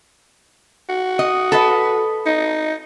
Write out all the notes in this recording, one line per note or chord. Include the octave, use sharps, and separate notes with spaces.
F#4
D#5
A4 B4 D#5
D#4